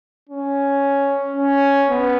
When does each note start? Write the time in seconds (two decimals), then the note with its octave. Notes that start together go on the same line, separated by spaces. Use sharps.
0.29 C#4
1.37 C#4
1.90 B3